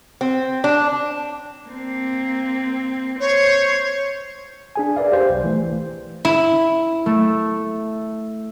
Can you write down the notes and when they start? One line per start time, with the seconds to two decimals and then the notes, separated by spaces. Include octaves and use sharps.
0.21 C4
0.64 D4
1.68 A#3 C4
3.20 C5 C#5
4.76 D4 G#4 G#5
4.96 A#4 B4 D5 E5 F5
5.12 G4 C5
5.29 B1
5.44 E3 A3
6.25 E4
7.06 A3